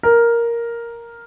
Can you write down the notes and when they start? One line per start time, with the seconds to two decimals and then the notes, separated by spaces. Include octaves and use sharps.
0.03 A#4